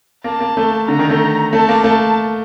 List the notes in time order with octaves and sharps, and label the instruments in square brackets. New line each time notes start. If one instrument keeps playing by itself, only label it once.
[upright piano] A#3 [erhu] A5
[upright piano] A#3
A3
[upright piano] D3 [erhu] A#5
[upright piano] D#3
A3
[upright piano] A3 [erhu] A5
[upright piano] A#3
[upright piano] A3 [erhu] A5